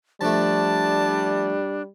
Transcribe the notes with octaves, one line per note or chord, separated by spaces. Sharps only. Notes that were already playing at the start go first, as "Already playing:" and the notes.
F3 G3 A3 D4 A5